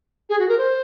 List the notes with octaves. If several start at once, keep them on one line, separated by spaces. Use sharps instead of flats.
G#4
F#4
A#4
C5